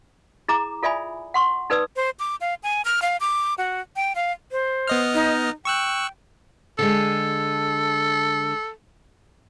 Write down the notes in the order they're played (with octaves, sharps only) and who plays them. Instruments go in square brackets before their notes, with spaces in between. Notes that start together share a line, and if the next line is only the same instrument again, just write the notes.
[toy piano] E4 G#4 A#5 D6
F4 A4 D5 E5 G#5 B5
F#5 C6 C#6
D#4 A4 B4 D5 D#6 E6
[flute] C5
D6
F5
G#5
F6
F5
D6
F#4
G5
F5
[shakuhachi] C5
[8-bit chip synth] B3 D#5 F6
[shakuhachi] D#4
[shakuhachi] G5 [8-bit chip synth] C#6 E6 F#6
[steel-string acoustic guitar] D3 G#3 [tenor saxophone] A4